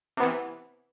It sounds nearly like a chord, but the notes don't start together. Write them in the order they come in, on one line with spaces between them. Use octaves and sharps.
C3 B3 E3